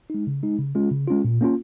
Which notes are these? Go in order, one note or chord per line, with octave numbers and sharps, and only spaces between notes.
G#3 D#4
C#3
G#3 D#4
C#3
G#3 C#4 F4
C#3
G#3 C#4 F4
A#2
A#3 C#4 F4